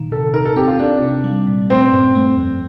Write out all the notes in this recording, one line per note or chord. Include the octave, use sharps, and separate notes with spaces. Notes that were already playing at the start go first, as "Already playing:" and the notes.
Already playing: A#2 D#3
C3 A4
D#4 A#4
A4
C4 G4
F4
C4 D4
C3
G3
A#2
A3 C4
G2
A3
F2